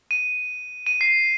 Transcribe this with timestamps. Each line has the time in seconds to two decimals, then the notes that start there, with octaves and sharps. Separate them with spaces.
0.11 D#7
0.86 D#7
1.01 C7